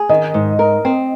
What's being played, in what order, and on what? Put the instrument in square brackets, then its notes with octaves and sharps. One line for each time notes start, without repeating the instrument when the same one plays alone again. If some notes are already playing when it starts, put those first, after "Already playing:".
Already playing: [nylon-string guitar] G#4
[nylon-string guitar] D#3 [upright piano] D#5
[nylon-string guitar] G#2
A#4
C4